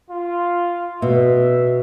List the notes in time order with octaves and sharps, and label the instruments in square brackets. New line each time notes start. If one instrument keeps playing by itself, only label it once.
[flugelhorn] F4
[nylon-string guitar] B2 [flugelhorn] E5